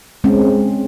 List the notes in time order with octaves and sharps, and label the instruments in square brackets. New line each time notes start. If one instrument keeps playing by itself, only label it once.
[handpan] G#3 C4 C#4